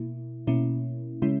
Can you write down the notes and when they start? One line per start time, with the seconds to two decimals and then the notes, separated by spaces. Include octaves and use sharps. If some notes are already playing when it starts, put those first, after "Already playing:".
Already playing: B2 A#3 E4
0.47 B2 A#3 C#4 E4
1.22 C#3 G#3 C#4 E4